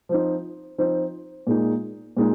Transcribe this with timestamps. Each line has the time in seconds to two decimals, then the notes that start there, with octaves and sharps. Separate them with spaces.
0.09 F3 C4 D#4
0.78 F3 C4 D#4
1.47 A#2 G#3 D#4
2.17 A#2 G#3 D#4